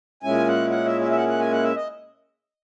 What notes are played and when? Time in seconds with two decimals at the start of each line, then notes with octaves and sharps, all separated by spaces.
0.23 A#2 G#3 C#4 E4 G#5
0.47 F#5
0.70 F#5
0.86 E5
1.01 E5
1.12 E5
1.17 F#5
1.28 F#5
1.40 G#5
1.52 F#5
1.63 E5
1.75 D#5